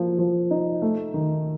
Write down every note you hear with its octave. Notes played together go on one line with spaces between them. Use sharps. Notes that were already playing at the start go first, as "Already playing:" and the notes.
Already playing: F3 A#3
F3
D#4
A3
D#3